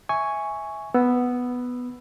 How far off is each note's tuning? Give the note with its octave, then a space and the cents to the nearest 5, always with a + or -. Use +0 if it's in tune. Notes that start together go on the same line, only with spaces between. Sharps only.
E5 -15 G#5 +0 C#6 +5
B3 +0 E6 +0